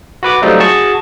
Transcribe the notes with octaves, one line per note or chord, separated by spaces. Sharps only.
F#4 B4 D6
F#3 G3 A3 C4 D#4 F4
F#4 G#4 A5 C#6